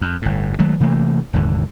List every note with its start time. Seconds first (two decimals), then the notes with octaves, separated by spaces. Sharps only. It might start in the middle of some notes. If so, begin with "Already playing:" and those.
0.01 F2
0.22 G1 A2
0.59 D#3 F#3 G#3 A3
0.80 C3 E3 A3 A#3
1.33 F1 D#2 G#2 D3